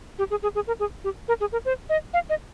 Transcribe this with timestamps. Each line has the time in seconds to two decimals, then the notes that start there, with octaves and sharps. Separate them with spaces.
0.19 G4
0.30 G#4
0.43 G#4
0.55 G#4
0.67 A#4
0.80 G#4
1.04 G4
1.28 A#4
1.40 G#4
1.52 A#4
1.65 C5
1.89 D#5
2.14 F5
2.30 D#5